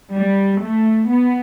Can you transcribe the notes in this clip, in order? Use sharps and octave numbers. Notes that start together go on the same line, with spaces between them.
G3
A3
B3